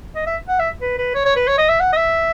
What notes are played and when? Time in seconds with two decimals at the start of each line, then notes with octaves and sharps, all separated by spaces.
0.15 D#5
0.27 E5
0.48 F#5
0.59 E5
0.81 B4
0.98 B4
1.15 C#5
1.25 C#5
1.36 B4
1.48 C#5
1.58 D#5
1.69 E5
1.80 F#5
1.92 D#5
1.97 E5